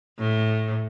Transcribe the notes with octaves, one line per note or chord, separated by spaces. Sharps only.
A2